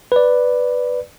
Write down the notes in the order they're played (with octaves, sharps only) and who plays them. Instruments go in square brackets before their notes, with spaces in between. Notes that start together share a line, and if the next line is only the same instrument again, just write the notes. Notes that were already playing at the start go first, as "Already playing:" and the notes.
[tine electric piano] B4 D5